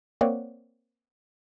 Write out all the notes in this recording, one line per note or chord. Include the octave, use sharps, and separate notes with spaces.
A#3 C4 C#5 D5 F#5